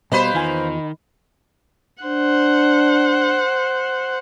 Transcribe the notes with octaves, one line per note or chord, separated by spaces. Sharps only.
B2 G3 A#3 B3 B4 C5 D#5 B5
E2 D#3 F4 G#5
D4 C5 F#5